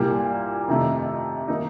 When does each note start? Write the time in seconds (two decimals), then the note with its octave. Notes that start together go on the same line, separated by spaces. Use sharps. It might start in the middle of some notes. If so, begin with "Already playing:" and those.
Already playing: C2 A#2 G3 A#3
0.68 F2 C3 D#3 A3
1.48 D#3 A#3 D#4